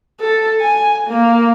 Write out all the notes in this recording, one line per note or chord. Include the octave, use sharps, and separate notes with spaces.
A4
G#5
A#3